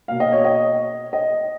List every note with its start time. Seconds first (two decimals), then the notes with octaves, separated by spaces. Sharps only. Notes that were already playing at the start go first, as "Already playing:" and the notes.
0.08 B2 A#3 F5
0.20 D#5
0.32 C#5
0.44 D#5
1.13 D#5